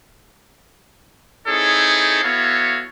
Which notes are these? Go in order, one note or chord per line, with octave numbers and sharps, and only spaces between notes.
C4 D#4 E4 G#4 A4 C#5
B3 E4 F#4 A4 C#5 F5